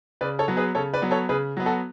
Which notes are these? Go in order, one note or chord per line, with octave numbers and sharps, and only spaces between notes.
C#3 B4 D5
A4 C#5
F#3 B3
G#4 B4
C#3 A4 C#5
B4 D5
F#3 B3
A4 C#5
C#3 G#4 B4
F#3 B3
F#4 A4